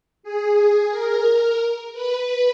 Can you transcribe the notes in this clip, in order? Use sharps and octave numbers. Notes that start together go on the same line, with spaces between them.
G#4
G#4
A#4
B4